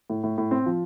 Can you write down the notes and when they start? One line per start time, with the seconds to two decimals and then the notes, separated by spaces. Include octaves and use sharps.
0.10 A2
0.24 A2
0.38 A2
0.51 C4
0.66 F3